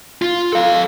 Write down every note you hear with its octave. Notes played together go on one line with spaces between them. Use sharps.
F4
A4 F5